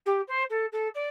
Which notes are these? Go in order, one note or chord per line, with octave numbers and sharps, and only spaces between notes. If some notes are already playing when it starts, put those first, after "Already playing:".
G4
C5
A4
A4
D5